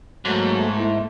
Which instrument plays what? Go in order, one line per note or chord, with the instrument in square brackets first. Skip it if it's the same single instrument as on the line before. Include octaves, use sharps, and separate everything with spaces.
[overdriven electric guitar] G#2 [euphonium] F#3 [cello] A3 A#3
[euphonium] E4